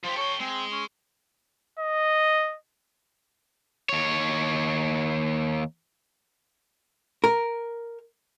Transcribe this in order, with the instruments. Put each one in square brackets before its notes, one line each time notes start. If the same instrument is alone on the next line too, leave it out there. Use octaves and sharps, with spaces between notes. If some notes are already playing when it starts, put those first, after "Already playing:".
[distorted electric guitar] F3 G4 [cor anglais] C5
[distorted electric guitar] A4 G5 [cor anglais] C#5
[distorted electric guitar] G#3 [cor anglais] C4
[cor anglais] C#4
[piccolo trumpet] D#5
[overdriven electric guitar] D#2 C#5
[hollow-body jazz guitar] A#4